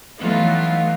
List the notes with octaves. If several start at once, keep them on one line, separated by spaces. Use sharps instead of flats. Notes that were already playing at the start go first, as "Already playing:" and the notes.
E3 F#3 A3 B3 D#4 F4